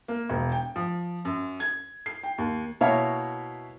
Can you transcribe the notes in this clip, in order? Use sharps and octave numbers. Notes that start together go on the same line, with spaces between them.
A#3
E1
G5
F3
F#2
G#6
C7
G5
D#2
B2 A#3 E4 C#5 F5